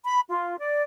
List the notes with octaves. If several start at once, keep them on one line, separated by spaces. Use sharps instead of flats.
B5
F4
D5